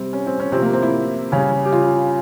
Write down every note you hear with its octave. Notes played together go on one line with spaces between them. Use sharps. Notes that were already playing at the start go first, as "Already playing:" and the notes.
Already playing: C3 G3 C4
C#4
C4
C#4
C3 F3 C4
A#3
C4
E4
C#3 G3 C#4
G4
F4